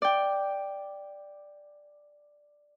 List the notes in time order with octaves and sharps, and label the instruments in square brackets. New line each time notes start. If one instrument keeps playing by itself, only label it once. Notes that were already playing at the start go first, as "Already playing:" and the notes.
[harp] D5 G5